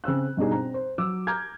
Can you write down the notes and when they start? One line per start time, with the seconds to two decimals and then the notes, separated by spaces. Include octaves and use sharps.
0.04 C#3 C4 E6 F#6
0.37 G2 B2 D4 D#4 G#4
0.52 C4 A#5
0.74 C5
0.98 F#3 D6 E6
1.27 A#5 D6 F6 G6 G#6